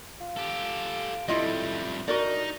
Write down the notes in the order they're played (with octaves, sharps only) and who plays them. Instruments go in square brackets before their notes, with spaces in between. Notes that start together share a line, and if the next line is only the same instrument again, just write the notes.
[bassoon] F4
[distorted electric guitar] G4 A4
[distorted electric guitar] F2 G3 [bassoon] A3 [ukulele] E4 F4 D#5
[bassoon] D4 [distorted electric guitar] D#4 [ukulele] F#4 A#4 D5